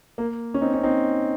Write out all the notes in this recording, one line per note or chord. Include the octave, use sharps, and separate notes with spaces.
A#3
C#4
C4 D#4
C#4
C4 D#4